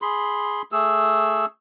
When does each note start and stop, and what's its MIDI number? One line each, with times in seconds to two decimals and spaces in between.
0.02 0.62 68
0.02 0.62 83
0.02 0.62 84
0.72 1.46 57
0.72 1.46 68
0.72 1.46 88